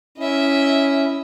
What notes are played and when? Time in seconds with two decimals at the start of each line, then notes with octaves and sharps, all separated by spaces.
0.18 C#4 E4 D#5 E5